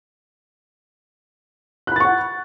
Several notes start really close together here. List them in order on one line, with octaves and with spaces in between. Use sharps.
F#6 B5 A6 C#6 F#5